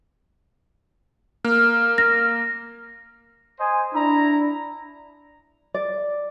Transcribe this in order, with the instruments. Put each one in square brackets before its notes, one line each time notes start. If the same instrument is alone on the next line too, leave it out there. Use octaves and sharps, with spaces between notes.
[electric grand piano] A#3 [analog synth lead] F6
[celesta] A#6
[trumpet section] C5 D#5 G#5
[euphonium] D4 [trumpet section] E4 A#5
[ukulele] D5